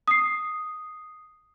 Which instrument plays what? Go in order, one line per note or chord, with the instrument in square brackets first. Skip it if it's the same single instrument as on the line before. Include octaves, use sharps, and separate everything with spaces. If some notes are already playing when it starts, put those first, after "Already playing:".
[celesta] D#6 C7